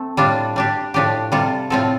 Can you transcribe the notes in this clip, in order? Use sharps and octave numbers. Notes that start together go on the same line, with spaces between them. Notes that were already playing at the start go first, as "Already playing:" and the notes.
Already playing: A3 C4 A4
A2 G3 D4 F4
G3 D4 G4
A2 F3 D4 G4
C3 G3 F4 A4
A2 F3 C4 F4 A4